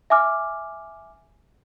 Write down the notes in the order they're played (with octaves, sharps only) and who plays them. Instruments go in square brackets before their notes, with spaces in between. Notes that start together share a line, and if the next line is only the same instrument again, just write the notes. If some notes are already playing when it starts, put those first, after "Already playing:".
[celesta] E5 G#5 D6 F6